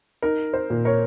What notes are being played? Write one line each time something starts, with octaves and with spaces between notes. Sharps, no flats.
D#4 A#4
C5
A#2
A#4 C#5